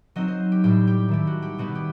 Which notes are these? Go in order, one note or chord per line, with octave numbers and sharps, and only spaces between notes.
F#3 C4 D#4 D#5
C5
G4
A2 G3 C4 G4
G4
D#3 A3 E4 G4
F#4
G4
B2 G3 B3 E4 F#4
G4